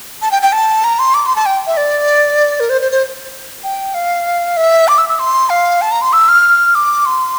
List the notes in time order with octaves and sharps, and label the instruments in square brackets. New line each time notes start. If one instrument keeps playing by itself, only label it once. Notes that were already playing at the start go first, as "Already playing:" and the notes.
[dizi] A5
G5
G5
A5
A#5
C6
D6
C6
A5
G5
E5
D5
A#4
C5
C5
C5
G5
F5
E5
D6
E6
E6
C6
F5
A5
A#5
C6
E6
F6
D6
C6